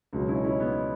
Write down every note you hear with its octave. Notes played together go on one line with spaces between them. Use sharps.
C#2 B2 F#3
C#4 E4
D#4
C#4 E4
B3 D#4